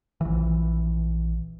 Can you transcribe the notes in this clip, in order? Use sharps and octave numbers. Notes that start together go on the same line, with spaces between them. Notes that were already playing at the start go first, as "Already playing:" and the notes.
A#1 E3